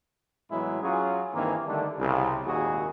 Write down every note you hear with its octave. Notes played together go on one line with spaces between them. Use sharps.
A2 E3 F#3 G#3 B3 E4
F#3 C#4 F4 F#4 G#4
G2 D#3 E3 A#3 C4
D3 D#3 G3 A3 D4
C2 C#3
G#1 D#2 A#2 F#4 G#4